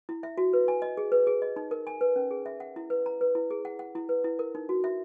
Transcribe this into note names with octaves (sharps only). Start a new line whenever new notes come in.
E4
E5
F#4
B4
G#5
D#5
G#4
B4
G#4
D#5
D#4
A#4
G#5
B4
C#4
G#4
E5
F#5
E4
B4
A#5
B4
E4
G#4
F#5
F#5
E4
B4
E4
A#4
D#4
F#4
E5